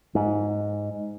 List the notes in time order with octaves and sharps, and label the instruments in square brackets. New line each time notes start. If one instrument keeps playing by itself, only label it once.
[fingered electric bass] G#2